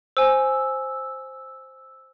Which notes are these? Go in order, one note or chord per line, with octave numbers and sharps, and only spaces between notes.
C5 G#5 E6